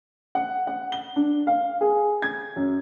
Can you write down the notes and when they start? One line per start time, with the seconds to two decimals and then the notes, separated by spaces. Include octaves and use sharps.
0.35 F#5
0.67 F#5
0.92 G7
1.16 D4
1.47 F5
1.81 G#4
2.22 G#6
2.56 F#2